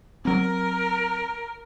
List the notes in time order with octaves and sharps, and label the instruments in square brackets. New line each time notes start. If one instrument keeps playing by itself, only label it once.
[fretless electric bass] F#3 C4 [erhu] A#4